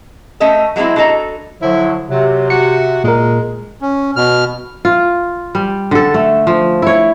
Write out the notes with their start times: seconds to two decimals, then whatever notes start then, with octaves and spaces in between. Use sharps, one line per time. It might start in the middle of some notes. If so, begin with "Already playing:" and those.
0.40 A3 C#4 A4 D#5 E5
0.76 F#3 G#3 A#3 C4 E4
0.96 D4 F#4 A4 D#5 A#5
1.62 D3 F3 F#3 E4
2.10 C3 F#3
2.50 F#4 C#7
3.04 A#2 G#3 A#4
3.81 C#4
4.16 B2 F6
4.85 F4
5.55 G3
5.91 D3 A4
6.14 A3
6.47 F3
6.82 E4 C#5